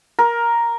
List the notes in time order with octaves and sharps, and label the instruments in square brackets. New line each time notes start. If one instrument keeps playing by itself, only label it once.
[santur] A#4